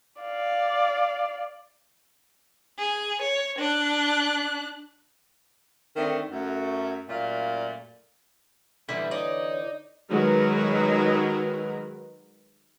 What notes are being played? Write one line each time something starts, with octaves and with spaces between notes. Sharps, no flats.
D5 F5
G#4
C#5
D4 F#6
D3 D#3 A3 C4 D4
F#2 A3
F#2 A#2 A3 D5 F5
A#2 D3 E3 G3 E4
D#4 C#5 D5
D#3 F#3 G#3 A#4 B4